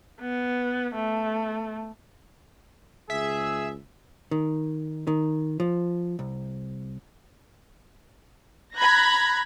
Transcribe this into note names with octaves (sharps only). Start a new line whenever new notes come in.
B3
A3
C#2 G#4 E5
D#3
D#3
F3
C2
A#5 B5 F#6 G#6 A#6